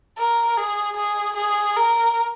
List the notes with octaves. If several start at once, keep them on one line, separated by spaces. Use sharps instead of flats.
A#4
G#4
G#4
G#4
A#4